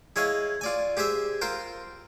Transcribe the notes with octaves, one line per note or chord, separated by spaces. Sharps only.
E4 G#4 C#5 D#5 F5
F4 D5 G#5
G4 G#4 C5 E5
F4 A#4 C5 G5